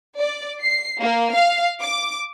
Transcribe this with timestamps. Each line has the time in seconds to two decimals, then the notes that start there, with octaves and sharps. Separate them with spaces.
0.19 D5
0.61 C7
1.01 A#3
1.34 F5
1.82 D6